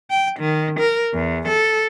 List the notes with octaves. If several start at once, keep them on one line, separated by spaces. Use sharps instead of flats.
G5
D#3
A#4
E2
A4